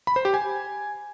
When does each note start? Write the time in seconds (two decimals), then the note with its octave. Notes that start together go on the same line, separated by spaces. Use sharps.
0.07 B5
0.16 C5
0.25 G4
0.34 G#5